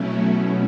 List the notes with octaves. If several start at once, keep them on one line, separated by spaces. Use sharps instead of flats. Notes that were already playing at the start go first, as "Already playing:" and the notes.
Already playing: B2 F#3 A3 C#4 E4